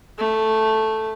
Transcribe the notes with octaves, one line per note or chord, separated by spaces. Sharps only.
A3